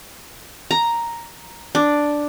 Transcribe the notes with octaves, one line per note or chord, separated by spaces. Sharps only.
A#5
D4